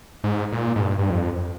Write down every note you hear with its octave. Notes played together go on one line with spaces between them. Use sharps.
G#2
A#2
G#2
G2
G2
F2